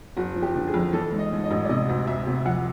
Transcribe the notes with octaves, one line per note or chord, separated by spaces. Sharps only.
F#1 F#4
F3
G4
D3
G#4
F2
E3 A4
G#2
D#5
G#2
D#5
A1
D5
C3 D#5
D2
D2 E5
C3
F2 F#5